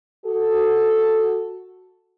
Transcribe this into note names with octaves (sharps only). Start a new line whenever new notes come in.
F#4 A4